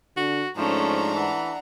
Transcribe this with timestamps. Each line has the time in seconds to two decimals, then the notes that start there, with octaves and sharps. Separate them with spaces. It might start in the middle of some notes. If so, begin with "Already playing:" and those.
0.17 D3 F#4
0.57 G#2 F3 A3 C#4 D4 A#5
1.15 E3 F#5